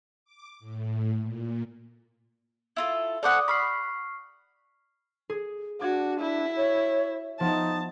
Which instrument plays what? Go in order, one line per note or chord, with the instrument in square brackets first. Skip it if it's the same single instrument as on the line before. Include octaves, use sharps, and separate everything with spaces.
[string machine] D6
A2
A#2
[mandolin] E4 F4 A4
[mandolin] A4 C5 F#5 [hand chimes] D5 D6 D#6
[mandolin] B5 [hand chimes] C#6 F6 C7
[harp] G#4
[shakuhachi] D4 [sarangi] F#4 [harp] D6 G#6
[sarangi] E4
[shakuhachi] C#5
[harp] F3 B3 [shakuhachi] D#4 [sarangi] A5